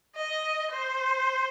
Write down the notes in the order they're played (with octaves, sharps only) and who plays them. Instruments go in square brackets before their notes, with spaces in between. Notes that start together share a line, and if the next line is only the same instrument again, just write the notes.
[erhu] D#5
C5